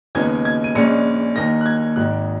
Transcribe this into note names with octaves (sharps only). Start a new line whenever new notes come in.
D#2 C#3 G#3 B3 D#4 G#6
G#6
D#7
A#1 A#2 G#3 C#4 C#7
D#2 D#3 A#3 D#4 A#6
F#6
G#6
G#1 G#2 D#3 F#6